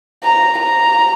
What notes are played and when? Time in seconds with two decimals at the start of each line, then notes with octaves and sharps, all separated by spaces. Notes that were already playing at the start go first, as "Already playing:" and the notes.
0.23 A#5
0.58 A#5